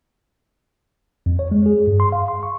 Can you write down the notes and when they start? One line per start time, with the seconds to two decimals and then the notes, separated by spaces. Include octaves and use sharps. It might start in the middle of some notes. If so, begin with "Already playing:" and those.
1.26 F2
1.39 C#5
1.51 G#3
1.66 G#4
1.87 G2
2.00 C6
2.12 F5
2.28 C6
2.43 C#6